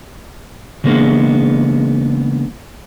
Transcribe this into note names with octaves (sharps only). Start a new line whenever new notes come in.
C#3 E3 G#3 A#3 B3 D4